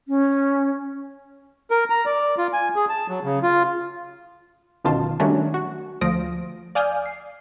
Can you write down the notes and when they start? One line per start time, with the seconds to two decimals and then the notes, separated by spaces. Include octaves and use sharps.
0.08 C#4
1.71 A#4
1.90 A#5
2.06 D5
2.38 F4
2.53 G#5
2.76 G#4
2.89 A5
3.09 F#3
3.24 C#3
3.43 F4
4.84 G1 F#2 B2 D#3 F4 A5
5.20 D#3 F#3 G3 A3 C#4 D4
5.54 F#4
6.01 D2 F3 D#6 A#6 D7
6.75 D5 F5 G#5 D#6 F6 G6
7.06 C7